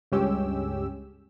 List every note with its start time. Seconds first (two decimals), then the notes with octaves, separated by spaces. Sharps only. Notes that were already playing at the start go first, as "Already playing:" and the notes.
0.12 C#2 G2 G#3 C#4 G4 E6